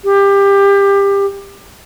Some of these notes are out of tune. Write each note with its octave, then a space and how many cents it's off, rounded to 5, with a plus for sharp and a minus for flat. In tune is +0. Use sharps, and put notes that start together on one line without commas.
G4 +20